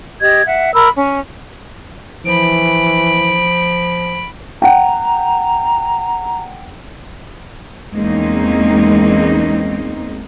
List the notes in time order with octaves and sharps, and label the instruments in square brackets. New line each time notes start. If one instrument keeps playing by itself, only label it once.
[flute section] G4 D#5 G#6
E5 F#5
A#4 B5 E6
C#4
[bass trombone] E3 [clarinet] F3 [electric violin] B5 D7
[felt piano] F#5 G5 [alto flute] A#5
[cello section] E2 G#3 A#3 C4 C#4 D#4